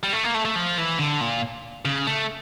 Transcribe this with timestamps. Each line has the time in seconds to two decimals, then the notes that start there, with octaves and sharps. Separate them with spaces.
0.03 G3
0.13 A3
0.24 A#3
0.34 A3
0.45 A3
0.56 F3
0.78 E3
0.99 D3
1.21 A#2
1.85 C#3
2.07 A3